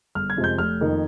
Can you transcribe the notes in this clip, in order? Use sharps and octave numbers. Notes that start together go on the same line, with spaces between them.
G1 F6
G#6
F2 C3 F3 G#3
G6
F1 F6
F2 D#3 A#3 D#4